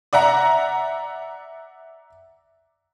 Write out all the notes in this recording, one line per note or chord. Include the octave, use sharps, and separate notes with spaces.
D5 E5 F#5 A#5